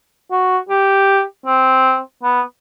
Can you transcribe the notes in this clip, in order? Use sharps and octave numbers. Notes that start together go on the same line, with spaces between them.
F#4
G4
C4
B3